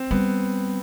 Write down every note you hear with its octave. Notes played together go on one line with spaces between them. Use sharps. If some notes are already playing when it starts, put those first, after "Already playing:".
Already playing: C4
G3 B3